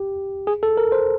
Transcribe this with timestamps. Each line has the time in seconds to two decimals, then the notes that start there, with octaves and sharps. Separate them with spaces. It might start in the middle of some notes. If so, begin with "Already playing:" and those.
Already playing: G4
0.47 G#4
0.63 A4
0.77 A#4
0.92 C5